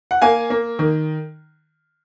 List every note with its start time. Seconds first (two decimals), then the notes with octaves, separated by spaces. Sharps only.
0.11 F#5
0.22 A#3 F5 G#5
0.50 A#3
0.79 D#3